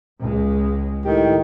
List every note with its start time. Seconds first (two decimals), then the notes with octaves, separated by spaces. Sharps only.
0.21 C#2 G#3
1.05 A2 D#3 G4